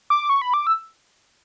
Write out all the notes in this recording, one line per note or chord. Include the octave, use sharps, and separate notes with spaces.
D6
C#6
B5
D6
E6